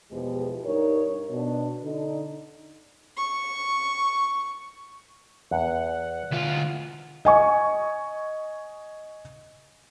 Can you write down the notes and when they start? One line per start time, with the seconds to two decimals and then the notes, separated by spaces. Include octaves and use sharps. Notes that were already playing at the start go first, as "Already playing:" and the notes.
0.11 E2 B2 F3 G#3 G4
0.65 G2 D#4 A#4 C#5
1.30 B2 D4
1.83 D3 D#4
3.17 C#6
5.51 E2 F#5
6.31 D2 F4 E5
7.25 D#5 G#5 C#6